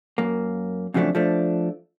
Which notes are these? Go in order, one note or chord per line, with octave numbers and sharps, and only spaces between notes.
F#2 A#3
F2 C#3 F3 F#3 A3 D4
F3 A3 D4